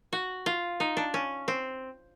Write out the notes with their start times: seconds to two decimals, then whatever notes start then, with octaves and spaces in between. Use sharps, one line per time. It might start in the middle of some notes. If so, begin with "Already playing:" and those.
0.13 F#4
0.46 F4
0.80 D#4
0.97 D4
1.14 C#4
1.48 C4